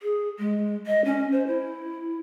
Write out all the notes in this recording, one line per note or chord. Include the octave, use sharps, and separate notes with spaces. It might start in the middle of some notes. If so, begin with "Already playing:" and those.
G#4
G#3
D#5
C#4
C5
E4